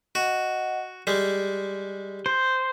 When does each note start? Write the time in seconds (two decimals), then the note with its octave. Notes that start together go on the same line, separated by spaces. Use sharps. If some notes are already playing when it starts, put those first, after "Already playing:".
0.15 F#4 D#5 F#5
1.07 G3 G#3 G4
2.26 C5